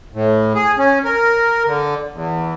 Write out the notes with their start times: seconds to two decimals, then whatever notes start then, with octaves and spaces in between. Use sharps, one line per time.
0.14 A2
0.55 G#4
0.78 C#4
1.04 A#4
1.66 D3
2.13 E2